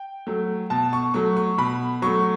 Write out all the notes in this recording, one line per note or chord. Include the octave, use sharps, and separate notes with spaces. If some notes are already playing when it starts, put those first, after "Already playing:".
Already playing: G5
F#3 A3
B2 A5
C#6
F#3 A3 C#6
C#6
B2 B5
F#3 A3 C#6